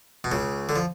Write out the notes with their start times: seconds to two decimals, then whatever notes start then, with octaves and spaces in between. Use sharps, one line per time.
0.24 B2
0.31 C#2 C#3
0.69 D3
0.76 F3